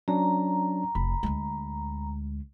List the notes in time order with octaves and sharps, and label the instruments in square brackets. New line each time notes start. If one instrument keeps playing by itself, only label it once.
[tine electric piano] F#3 C#4 D4 [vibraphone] A#5
[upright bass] F1 [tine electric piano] B5
[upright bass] D2 G#3